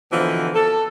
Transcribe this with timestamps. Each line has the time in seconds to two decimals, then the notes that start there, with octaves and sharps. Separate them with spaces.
0.12 B2 D3 E3 F3 A#3
0.54 A4